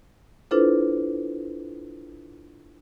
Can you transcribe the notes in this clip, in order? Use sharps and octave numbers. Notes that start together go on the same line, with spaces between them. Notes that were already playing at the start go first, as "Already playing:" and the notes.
D4 E4 F4 A4 B4 C5